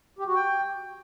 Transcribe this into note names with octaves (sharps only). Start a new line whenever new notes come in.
G4
F#4
G5